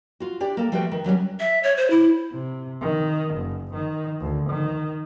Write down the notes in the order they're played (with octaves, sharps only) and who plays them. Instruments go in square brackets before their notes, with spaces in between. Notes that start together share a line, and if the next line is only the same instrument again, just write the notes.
[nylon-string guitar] F4 F#4
D4 G4 D5
A#3 A4
F3 G3 A3 F#4 B4 G5
D#3
D#3 F#3 G3 C#4
[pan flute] E5
C#5
C5
E4
[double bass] C3
D#3
F#1
D#3
D2
D#3